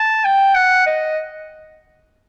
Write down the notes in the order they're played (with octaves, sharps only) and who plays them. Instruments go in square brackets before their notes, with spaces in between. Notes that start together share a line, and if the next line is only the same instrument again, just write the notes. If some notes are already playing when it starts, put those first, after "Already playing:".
Already playing: [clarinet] A5
G5
F#5
D#5